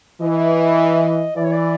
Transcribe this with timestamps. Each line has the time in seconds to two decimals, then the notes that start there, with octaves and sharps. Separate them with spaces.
0.21 E3 D#5
1.36 E3 D5
1.44 C#5
1.52 D5